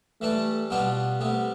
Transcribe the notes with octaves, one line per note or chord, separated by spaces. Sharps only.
E3 G3 A3 D4 A4
B2 G3 B3 D4 F4
C3 G3 A3 B3